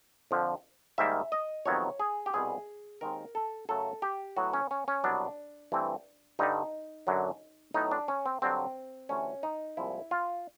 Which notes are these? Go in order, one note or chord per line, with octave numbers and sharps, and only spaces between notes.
F2 D3 F3
G#2 D#3 G3 A#3 E5
D#5
F2 C3 D#3 F#3 B3 C#5
G#4
G4
C2 B2 G3 C4 G#4
D#2 D#3 G#3 C4 A#4
A4
F#2 C#3 F#3 A3 A4
G4
A2 F#3 B3 F#4
C#4
C#4
C#4
C2 B2 F#3 B3 D4
G2 E3 A3 C4
G2 D3 G3 D#4
F#2 D3 F#3
A2 F#3 B3 D#4
D4
C#4
C4
G2 D3 F#3 C4
D2 C3 E3 A3 C#4
D#4
C2 A#2 F3 G#3 E4
F4